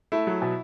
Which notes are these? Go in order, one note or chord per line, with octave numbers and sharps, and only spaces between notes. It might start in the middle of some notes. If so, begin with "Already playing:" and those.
A3 E4
F#3
B2